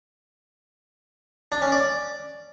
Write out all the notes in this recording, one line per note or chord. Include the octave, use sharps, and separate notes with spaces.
D4
C#4
D5